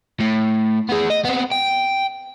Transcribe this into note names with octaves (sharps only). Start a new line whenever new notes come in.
A2
B3 G#4
D#5
B3 C4
G5